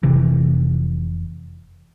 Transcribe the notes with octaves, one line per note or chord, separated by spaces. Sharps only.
F1 C3 E3